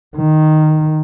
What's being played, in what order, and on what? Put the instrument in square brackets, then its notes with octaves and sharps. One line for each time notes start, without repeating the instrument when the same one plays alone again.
[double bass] D#3